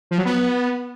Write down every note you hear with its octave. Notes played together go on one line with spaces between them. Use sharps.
F3
F#3
B3